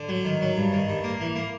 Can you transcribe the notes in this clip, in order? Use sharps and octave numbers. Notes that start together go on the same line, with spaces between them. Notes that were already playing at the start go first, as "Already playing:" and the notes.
Already playing: D3
F#3
D#3
F#3
G2
D#3
G2
A#3
E3
A#3